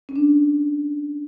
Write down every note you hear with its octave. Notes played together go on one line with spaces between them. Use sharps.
C#4
D4